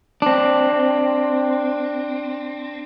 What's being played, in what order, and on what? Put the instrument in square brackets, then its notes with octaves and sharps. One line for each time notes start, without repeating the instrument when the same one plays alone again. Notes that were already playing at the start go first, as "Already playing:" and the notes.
[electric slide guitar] C4 D4